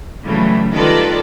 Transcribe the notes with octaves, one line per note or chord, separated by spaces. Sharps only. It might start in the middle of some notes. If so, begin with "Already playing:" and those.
C#3 E3 F#3 G3 A3
D#3 G3 F4 A4 B4 D5